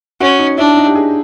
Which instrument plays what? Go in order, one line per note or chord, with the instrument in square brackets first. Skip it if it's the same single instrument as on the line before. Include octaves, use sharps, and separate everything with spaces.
[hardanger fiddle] C#4 [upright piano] F#4
[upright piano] D#4
[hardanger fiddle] D4 [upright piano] E4
[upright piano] D#4
G4
G#4